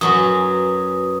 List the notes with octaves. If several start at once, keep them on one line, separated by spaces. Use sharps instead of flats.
F#2 F#3 C#4 F#4 B4 D#6